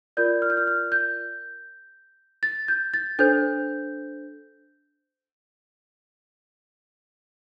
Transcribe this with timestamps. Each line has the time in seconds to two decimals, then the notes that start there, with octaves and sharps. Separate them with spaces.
0.17 F4 A#4 D5 G6
0.42 F6
0.50 G6
0.57 F6
0.67 F6
0.92 G6
2.43 A6
2.68 G6
2.94 A6
3.19 D4 A4 C5 G6